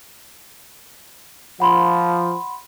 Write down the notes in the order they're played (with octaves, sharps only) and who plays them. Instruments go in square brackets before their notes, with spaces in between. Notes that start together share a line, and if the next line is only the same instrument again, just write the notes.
[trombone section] F3 [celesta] F#5 B5 C6